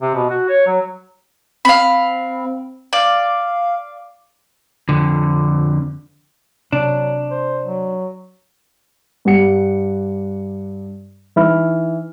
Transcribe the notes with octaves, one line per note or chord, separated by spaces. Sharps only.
C3
B2
F#4
C#5
F#3
C4 F5 B5
D5 F5
F2 D3
C3 F#3 D4
C5
F#3
G2 G4 F#5 C#7
E3 D#4 E5 B5 F6